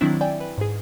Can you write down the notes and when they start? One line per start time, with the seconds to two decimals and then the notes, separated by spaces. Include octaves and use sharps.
0.01 D#3 F#3 C4 D4 E4
0.21 D5 E5 G5 G#5
0.40 B4
0.58 G#2 G#4